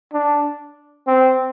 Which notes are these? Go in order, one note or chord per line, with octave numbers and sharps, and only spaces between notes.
D4
C4